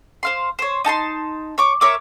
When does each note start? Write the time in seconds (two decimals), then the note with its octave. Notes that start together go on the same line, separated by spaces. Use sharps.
0.23 C5 F5 C6
0.59 C5 C#5
0.85 D#4 A5 A#5 C6
1.58 C#5 C#6 D6
1.81 A#4 C#5 E5 D6